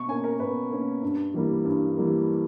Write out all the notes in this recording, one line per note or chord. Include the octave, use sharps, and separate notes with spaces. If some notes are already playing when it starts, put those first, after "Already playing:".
Already playing: B2 C#6
A#3 C#4 G#5
A#4
B2 B4
A#3 C#4
G2
E3 G3 A#3
G2
E3 G3 A#3